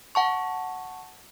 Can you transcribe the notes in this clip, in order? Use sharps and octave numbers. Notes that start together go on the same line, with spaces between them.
F#5 A5 C#6